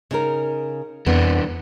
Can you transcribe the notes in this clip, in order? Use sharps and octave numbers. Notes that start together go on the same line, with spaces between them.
C#3 D#4 A#4
F2 E3 B3 D4